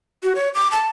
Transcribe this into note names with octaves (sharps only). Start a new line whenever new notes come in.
F#4
C#5
D6
A5